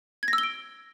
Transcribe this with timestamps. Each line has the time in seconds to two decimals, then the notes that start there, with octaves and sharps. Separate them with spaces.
0.23 G#6
0.28 A#6
0.33 E6
0.38 G7
0.43 D7